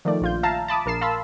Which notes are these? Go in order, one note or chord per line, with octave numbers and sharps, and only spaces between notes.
D#3 F3 A3 D5
A#1 F4 G6
E5 F5 A5 A#5
A5 B5 D6 D#6
A#1 A#4 A5 C7 E7
F5 A5 B5 C6 E6